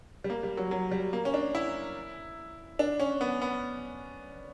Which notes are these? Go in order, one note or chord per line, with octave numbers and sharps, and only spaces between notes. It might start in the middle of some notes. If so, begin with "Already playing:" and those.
G3
A#3
G3
F#3
F#3
G3
A#3
C#4
D4
E4
D4
C#4
B3
B3